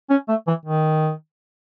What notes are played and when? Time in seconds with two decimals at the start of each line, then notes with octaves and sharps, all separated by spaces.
0.10 C#4
0.29 A3
0.47 E3
0.66 D#3